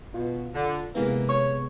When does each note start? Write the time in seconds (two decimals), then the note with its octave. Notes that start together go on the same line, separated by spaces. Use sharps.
0.14 B2 F4
0.55 D3
0.95 C3 E3 G#3 A#3 B3
1.29 C#5 C#6